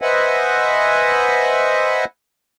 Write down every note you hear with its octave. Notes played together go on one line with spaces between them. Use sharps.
B4 C5 D#5 E5 F#5 G#5